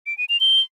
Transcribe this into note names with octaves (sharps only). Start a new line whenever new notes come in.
D7
D#7
F7
G7